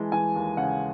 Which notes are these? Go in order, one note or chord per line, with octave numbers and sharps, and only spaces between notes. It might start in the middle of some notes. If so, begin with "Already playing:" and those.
Already playing: E3 G#3 A5
E3 G#5
D#2
C#3 F#5